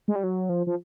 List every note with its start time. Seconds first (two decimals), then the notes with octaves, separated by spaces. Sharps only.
0.08 G#3
0.16 G3
0.24 F#3
0.49 F3
0.67 F3